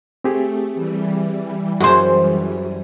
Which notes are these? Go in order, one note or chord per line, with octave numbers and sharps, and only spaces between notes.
A3 C4 G4 G#4
E3 G3
F#2 F#4 G#4 C5